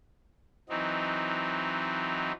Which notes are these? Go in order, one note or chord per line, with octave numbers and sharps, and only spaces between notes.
E3 F#3 C4 D#4